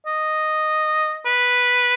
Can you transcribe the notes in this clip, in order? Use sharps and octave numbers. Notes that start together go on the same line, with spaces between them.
D#5
B4